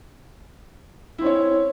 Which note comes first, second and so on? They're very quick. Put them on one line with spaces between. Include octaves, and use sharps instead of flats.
E4 C4 C#4 C#5